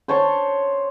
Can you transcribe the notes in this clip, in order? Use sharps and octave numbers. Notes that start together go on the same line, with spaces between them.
C5 C#5 A5 C#6